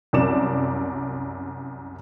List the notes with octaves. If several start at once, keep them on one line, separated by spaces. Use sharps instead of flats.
C2 F#2 D5 E7